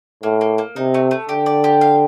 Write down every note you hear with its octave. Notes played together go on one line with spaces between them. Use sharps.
A2 A#3
A#3
A#3
C3 D#4
A3
A3
D3 G4
D5
G4
F5